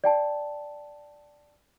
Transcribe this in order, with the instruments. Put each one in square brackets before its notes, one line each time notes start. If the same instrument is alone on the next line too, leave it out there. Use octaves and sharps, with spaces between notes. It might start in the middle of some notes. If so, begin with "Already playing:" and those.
[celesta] D5 G5 A5